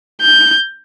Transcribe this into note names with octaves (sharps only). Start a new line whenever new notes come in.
G6